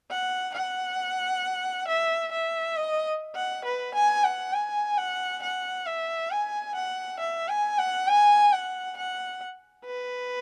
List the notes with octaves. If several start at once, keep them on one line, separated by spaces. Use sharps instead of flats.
F#5
F#5
E5
E5
D#5
F#5
B4
G#5
F#5
G#5
F#5
F#5
E5
G#5
F#5
E5
G#5
F#5
G#5
F#5
F#5
B4